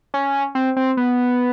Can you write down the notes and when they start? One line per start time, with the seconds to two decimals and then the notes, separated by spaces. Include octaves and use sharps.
0.14 C#4
0.55 C4
0.77 C4
0.97 B3